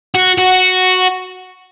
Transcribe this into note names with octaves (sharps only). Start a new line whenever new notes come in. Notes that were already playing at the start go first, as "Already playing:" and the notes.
F#4
F#4